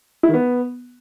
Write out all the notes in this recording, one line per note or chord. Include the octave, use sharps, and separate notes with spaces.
E4
D#3
B3